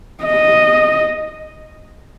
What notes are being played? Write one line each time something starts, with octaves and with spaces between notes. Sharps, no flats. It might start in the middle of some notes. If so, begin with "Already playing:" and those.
D#5